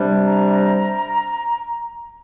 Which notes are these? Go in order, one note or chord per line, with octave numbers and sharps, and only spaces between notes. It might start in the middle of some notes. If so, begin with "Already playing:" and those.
Already playing: C3 G3 D4
A#5